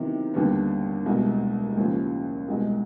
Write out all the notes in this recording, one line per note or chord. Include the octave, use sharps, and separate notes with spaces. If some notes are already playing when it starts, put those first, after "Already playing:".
Already playing: C3 D#3 F#3 B3 E4
D#2 D3 G3 B3
C2 B2 G#3
D#2 C#3 F3
C2 B2 G#3